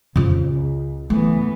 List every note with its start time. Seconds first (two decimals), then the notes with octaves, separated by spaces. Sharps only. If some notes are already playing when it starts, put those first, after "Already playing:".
0.16 F2 C#3 F4
0.47 C#2
1.10 E3 A3 B3